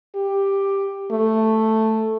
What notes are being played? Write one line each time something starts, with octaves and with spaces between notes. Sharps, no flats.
G4
A3